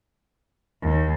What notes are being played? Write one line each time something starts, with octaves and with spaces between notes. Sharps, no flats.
D#2